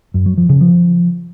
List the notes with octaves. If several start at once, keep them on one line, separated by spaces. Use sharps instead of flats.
F#2
F#3
F3
C#3
F3